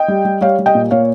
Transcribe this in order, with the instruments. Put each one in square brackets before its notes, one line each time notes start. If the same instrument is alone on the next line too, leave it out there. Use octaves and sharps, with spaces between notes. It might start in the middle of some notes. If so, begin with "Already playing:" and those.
Already playing: [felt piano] D#5 G5
G3
G3
G3 C#5 F5
G3
D#5 G5
A#2
A#2 C#5 F5